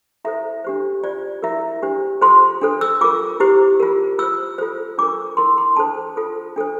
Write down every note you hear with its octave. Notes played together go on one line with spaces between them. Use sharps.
E4 A4 C5 E5
D4 G4 C5
F4 C5 D5
E4 A#4 E5
D4 G4 C5
F4 A4 C5 C6
D4 A4 C5
E6
F4 A#4 D6
E4 G4 C5
F4 A#4
F4 C5 E6
F4 A4 C5
D4 F4 A#4 D6
E4 A#4 C6
C6
D4 A4 C5 A5
F4 A4 C5
D4 A4 C5